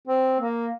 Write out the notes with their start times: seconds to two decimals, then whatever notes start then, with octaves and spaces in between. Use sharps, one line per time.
0.08 C4
0.40 A#3